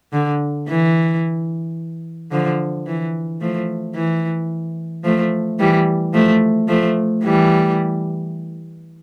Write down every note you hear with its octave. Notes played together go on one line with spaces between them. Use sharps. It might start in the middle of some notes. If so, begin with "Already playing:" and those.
D3
E3
D3 F3
E3
F3 A3
E3
F3 A3
E3 G3
F3 A3
F3 A3
E3 G3